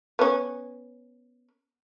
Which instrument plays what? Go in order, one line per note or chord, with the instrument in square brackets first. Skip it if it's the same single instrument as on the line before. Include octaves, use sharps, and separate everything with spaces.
[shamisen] B3 C#4